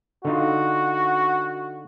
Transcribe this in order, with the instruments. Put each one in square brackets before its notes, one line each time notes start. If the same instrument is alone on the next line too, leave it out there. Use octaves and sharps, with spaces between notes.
[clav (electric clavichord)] D3 D#4 F4 [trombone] F#4